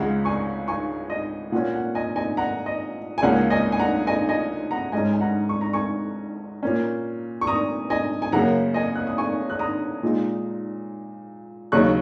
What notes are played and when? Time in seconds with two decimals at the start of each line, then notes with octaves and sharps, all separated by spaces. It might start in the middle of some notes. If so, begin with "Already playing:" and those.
Already playing: C#2 C#3 G#3 C#4 F#5 A#5
0.25 G#5 C#6
0.68 G#5 C#6
1.10 D#5
1.52 A#2 A#3 C#4 F#5
1.74 F#5
1.95 D#5 G#5
2.16 D#5 G#5
2.37 F#5 A#5
2.66 D#5
3.18 G#5
3.22 C#2 C#3 A#3 C#4 F#5
3.50 D#5 G#5
3.72 G#5
3.79 F#5 A#5
4.07 D#5 G#5
4.29 D#5 G#5
4.71 F#5 A#5
4.92 G#2 G#3 C#4 D#5 G#5
5.13 G#5
5.21 F#5 A#5
5.49 C#6
5.61 A#5
5.73 G#5 C#6
6.63 A#2 A#3 C#4
7.41 C#6
7.47 A#5 D#6
7.90 D#5 G#5
8.22 G#5
8.32 F#2 C#3 A#3 F#5 A#5
8.74 D#5 G#5
8.95 F#6
9.07 D#6
9.18 G#5 C#6
9.50 F#6
9.59 A#5 D#6
10.03 A#2 G#3 D#4
11.72 D#2 C#3 F#3 D#4 C#6 F#6